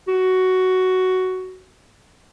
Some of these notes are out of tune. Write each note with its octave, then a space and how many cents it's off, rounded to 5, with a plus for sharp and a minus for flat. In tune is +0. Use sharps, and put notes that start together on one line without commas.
F#4 +10